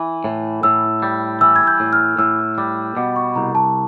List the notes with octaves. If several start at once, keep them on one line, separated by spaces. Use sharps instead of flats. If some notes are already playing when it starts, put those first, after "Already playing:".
Already playing: E3
A2
A2 E6
G3
E3 E6
G#6
G6
A2
F6
A2 E6
G3 D6
B2 D6
C#6
C2 A#5
A5